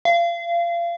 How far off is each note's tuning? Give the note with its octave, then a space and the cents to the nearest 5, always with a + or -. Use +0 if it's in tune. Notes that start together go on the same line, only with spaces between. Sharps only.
F5 -30